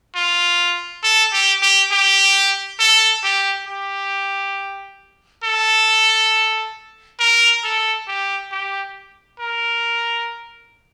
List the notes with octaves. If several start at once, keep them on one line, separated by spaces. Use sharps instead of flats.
F4
A4
G4
G4
G4
A4
G4
G4
A4
A#4
A4
G4
G4
A#4